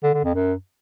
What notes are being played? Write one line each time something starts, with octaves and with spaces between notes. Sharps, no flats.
D3
D3
F2
F#2